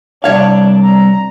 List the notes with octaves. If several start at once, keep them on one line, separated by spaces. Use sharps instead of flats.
C2 D4 C#5 F5
A#5